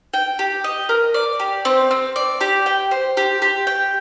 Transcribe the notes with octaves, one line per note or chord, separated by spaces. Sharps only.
G5
G4
D#5
A#4
D5
G4
C4
C4
D5
G4
G5
C5
G4
G4
G5